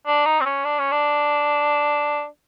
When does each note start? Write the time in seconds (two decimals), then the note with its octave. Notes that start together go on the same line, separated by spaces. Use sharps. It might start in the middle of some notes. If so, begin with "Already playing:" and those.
0.07 D4
0.26 D#4
0.41 C4
0.45 C#4
0.65 D4
0.79 C#4
0.92 D4